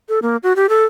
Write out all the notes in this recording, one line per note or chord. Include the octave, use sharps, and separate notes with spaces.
A4
A#3
F#4
G4
A4